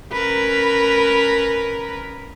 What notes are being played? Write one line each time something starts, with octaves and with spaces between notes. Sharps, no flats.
C#4 A#4 B4